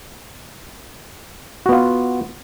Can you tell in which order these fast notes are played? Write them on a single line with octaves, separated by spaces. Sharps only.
F#4 B3 F4